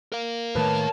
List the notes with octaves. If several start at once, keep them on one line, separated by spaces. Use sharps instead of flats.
A#4 F5
A2 D#3 A3 B4 C#5 A5